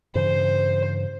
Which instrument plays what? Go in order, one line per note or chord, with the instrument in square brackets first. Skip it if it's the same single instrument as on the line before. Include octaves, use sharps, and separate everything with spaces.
[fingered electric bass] G2 C#3 E3 [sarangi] C5